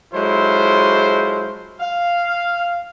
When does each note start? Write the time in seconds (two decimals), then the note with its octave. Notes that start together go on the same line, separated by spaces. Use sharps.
0.14 F#3 G#3 E4 F4 A4 C5
1.80 F5